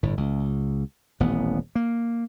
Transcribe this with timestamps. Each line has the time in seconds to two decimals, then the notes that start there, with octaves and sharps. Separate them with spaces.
0.03 G1 A2
0.17 C#2
1.20 D#1 A1 B3
1.75 A#3